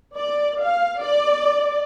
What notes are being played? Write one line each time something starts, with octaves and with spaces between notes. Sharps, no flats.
D5
F5
D5